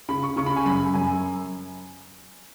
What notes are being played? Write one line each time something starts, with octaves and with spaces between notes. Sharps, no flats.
C#3 B5
C#6
C#3 C#6
B5
G#5
F#2 B5
F#2 G#5